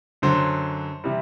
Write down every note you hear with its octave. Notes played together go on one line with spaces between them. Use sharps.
F#2 D3 F#3 C5
C3 E3 G3